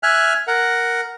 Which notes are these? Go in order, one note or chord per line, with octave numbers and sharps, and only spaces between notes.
E5 G#5 F6 F#6
A#4 F#5